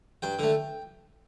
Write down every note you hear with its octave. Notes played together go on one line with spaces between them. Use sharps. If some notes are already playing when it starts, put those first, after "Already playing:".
G2 G5
D3 A3